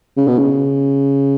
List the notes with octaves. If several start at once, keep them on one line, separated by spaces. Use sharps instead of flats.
C#3
B2
C#3